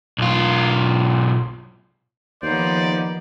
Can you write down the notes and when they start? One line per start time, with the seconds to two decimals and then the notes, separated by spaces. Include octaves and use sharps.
0.18 B1 F4
2.42 D#2 F3 B3 D#4 C5 D5